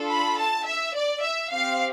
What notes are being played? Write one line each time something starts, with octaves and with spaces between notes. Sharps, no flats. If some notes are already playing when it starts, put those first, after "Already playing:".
Already playing: D4 F4 A4
B5
A5
E5
D5
E5
C4 G4 F5